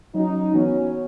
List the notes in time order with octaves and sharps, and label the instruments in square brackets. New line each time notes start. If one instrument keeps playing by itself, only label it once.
[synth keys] F#3 C#4 F#4 [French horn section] D#4
[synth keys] E3 B3 F#4 [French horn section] C#4